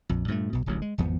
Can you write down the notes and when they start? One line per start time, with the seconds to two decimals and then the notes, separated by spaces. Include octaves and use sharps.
0.09 A#1 F2
0.28 G2 A#2 F#3 A3
0.53 B1 B2
0.66 D1 A1 D2 F#3
0.82 G#3
0.98 G#1 E2 F3 B3